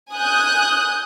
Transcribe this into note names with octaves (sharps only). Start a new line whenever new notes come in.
G#5 D#6 F#6 G6